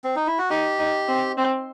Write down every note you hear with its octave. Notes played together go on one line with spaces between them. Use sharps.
C4
D#4
E4
F#4
D#4 G4
D#4
C4
C4